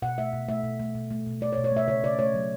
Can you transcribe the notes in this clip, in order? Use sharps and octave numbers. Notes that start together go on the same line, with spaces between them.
B2 F#5
A3 E5
B2
A3 E5
B2
A3
B2
A3
B2
A3 D5
C#5
B2
C#5
A3 E5
C#3 C#5
C#3 D5
A3 C#5
F#3